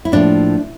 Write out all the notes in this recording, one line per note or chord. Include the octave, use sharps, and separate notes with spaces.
E4
A2 F3 A#3 D4